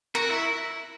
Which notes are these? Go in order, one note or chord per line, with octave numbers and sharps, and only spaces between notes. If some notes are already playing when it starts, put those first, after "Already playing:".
F#4 A#4
E4